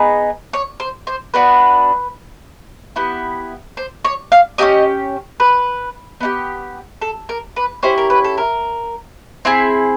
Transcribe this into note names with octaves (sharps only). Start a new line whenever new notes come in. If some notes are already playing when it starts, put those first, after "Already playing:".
Already playing: B3 D#4 G#4
C#5
C5
C5
B3 D4 F#4 B4
B3 E4 G4
C5
C#5
F5
C#4 E4 G4 D#5
B4
B3 D#4 G4
A4
A#4
B4
C#4 E4 G4 C5
A#4
B4
A4
A#4
C4 E4 G#4